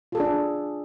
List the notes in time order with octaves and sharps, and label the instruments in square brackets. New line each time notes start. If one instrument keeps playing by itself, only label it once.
[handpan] F4
A4
G#4
D4